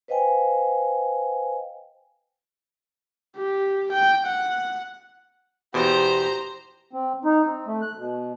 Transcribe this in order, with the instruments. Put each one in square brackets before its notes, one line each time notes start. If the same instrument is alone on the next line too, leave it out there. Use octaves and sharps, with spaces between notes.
[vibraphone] B4 C5 D#5 F5 G5 G#5
[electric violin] G4
G5
F#5
[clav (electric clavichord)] E2 B2 [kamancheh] G4 [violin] C5 A#5
[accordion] C4
D#4
C4
A3
F#6
B2